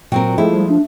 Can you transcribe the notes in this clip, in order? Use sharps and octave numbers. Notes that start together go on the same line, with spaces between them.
A#2 F#3 C4 A#4 G5
F3 G#3 A3 E4
G3
D4